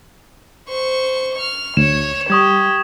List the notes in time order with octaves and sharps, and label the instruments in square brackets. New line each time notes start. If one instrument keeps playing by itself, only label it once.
[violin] C5 C#6
C#6 F6
[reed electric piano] D2 [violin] C#5 [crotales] E7
[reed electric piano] G3 [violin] G4 [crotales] C#6 D#6 G#6